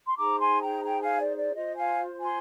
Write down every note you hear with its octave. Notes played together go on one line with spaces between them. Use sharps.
C6
D#4 G#4 C5 A#5 D6
G#5 C6
G5 A#5
G5 A#5
F5 G#5
D5
D5
F4 C5 D#5
F5 G#5
G#5 C6